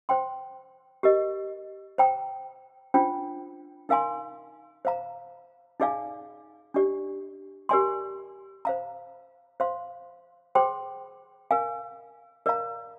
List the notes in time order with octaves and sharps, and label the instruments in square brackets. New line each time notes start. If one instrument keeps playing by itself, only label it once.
[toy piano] C5 G5 C6
G4 A#4 D#5
C5 G5 A#5
D4 F4 C5 G5
D#4 A#4 F5 G#5 C6
C5 F5 A#5
D#4 G#4 D5 F5 G#5
D4 G4 D5
G4 A#4 D5 G#5 C6
C5 F5 A#5
C5 F5 C6
G#4 C5 G5 C6
A#4 F5 G#5
A#4 D5 F5 A#5